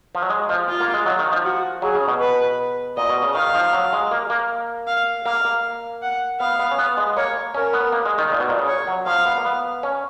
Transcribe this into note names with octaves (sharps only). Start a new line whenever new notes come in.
F3
F#3
G#3
F3
F4
A#3
G#3
F#3
D#3
F3
F#4
F#3 G#4
C#3
B2
B4
A#2 D#5
B2
C#3
D#3 F5
F3
F#3
G#3
A#3
A#3
F5
A#3 F5
A#3
F#5
B3 F5
B3
C#4
B3
G#3
A#3 C#5
C#4 A#4
B3
A#3
G#3
D#3
A#2
B2
A#2
C#3
C#5
F#3
F3 F5
B3
A#3
B3
C#4